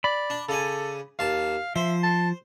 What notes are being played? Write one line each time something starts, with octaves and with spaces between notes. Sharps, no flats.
D5 B5
D4
C#3 A4 D5 G#5
D#2 F5 A5
F3 C5 E5
A5